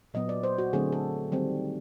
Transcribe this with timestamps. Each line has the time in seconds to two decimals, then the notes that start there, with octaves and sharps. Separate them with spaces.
0.14 A#2 F#3 B3 D#5
0.29 D5
0.43 C5
0.58 F#4
0.73 D3 F#3 A3 C4 G#4
0.92 A4
1.32 D#3 G3 C4